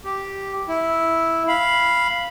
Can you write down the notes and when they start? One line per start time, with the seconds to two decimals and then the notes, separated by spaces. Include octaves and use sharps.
0.04 G4
0.68 E4
1.48 F5 B5